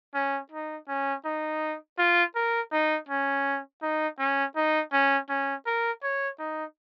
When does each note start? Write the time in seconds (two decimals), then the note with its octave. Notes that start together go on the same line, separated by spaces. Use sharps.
0.14 C#4
0.51 D#4
0.88 C#4
1.25 D#4
1.98 F4
2.35 A#4
2.72 D#4
3.08 C#4
3.82 D#4
4.19 C#4
4.56 D#4
4.92 C#4
5.29 C#4
5.66 A#4
6.03 C#5
6.39 D#4